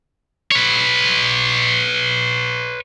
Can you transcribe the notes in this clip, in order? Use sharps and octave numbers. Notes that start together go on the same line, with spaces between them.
B4 C#5